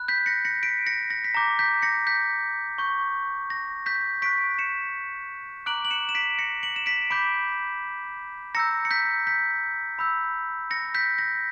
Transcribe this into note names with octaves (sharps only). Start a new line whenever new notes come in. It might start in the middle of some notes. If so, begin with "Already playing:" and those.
Already playing: B5 F#6
G6 B6
A#6 C#7
A#6 C#7
B6 D7
A#6 C#7
A#6
B6
A#5 D6 G6 A#6
G6 B6
A#6 C#7
G6 B6
C#6 G6
A#6
G6 B6
C#6 F#6 B6 D7
C#7 E7
A#5 D6 F#6 D7 F#7
F#7
C#7 E7
E7
B6 D7
A#6 C#7
D7 F#7
E7
B6 D7
B5 D6 G6 B6 D7
A#5 E6 G6 A#6 C#7
C#7
G6 B6
G6 B6
B5 E6 G6
A#6 C#7
G6 B6
A#6